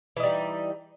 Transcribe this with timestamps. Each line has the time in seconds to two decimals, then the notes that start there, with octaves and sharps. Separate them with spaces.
0.17 E3
0.20 D#4
0.23 G3